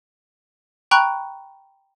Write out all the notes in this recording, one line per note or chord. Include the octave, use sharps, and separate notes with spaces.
G5 A#5 B5 C#6 F#6